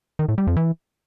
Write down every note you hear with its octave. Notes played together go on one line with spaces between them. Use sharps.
D#3
A2
G3
F2
E3